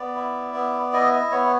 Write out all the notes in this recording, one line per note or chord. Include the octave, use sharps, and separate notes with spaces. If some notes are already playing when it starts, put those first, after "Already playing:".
Already playing: B3 D5
E4
B3
E4 D#5
D#5
B3 C#5